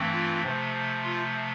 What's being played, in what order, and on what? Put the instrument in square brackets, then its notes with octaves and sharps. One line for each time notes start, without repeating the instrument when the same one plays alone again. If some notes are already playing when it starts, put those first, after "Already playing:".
Already playing: [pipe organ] G2 E3 A3 C4
F4
C3 F3 A3
F4